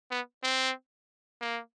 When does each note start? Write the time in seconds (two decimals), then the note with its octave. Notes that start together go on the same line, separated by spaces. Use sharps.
0.11 B3
0.43 C4
1.41 A#3